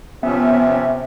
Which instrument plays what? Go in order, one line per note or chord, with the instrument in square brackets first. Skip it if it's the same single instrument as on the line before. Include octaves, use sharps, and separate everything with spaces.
[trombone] C3 [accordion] F3 C#4 [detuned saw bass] B3 [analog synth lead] E5